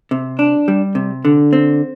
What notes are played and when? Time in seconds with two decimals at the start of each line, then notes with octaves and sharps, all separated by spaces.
0.11 C3
0.39 D4
0.68 G3
0.95 C3
1.25 D3
1.53 C4